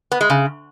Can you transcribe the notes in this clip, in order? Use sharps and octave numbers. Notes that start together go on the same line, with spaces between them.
B3
G#3
C#3